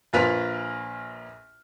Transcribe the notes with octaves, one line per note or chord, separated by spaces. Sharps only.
A#1 A#3 F4 B4 F6 B6